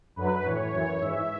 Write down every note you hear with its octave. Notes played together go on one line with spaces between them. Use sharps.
F#2 D3 F#3 B4
A2 E3 C#5
F#2 E3
G#2 E3 E5